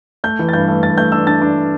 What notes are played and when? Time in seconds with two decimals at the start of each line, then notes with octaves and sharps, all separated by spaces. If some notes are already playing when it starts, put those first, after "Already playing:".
0.24 A3 G6
0.39 E3
0.49 A6
0.53 G2 G6
0.68 A3
0.83 G2 A6
0.98 A3 G6
1.12 D4 E6
1.27 D4 A6
1.42 D4